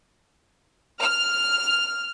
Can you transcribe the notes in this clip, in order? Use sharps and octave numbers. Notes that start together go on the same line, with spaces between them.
F6